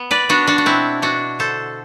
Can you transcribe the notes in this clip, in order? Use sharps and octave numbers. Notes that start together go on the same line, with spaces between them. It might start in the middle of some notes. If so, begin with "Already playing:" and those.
Already playing: B3
B4 D5
B3 D4 F#4
D4 F#4
F#4
B2 C4 E4
B2 D4 F#4
D3 A4 C5